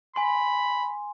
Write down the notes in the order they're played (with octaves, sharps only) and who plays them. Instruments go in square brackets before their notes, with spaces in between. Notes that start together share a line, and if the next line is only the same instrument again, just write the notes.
[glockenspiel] G#5 C6 [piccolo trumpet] B5